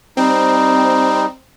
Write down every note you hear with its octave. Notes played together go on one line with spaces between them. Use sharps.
G3 C4 D#4